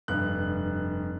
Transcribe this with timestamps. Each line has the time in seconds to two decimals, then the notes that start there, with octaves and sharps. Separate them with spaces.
0.08 F1 G2 F#6